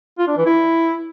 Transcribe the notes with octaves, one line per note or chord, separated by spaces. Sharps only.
F4
D4
E3
E4